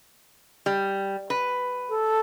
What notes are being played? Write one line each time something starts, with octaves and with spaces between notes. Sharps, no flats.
G3
B4
A4